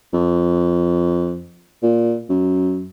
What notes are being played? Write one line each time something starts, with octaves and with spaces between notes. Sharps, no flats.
F2
A#2
F#2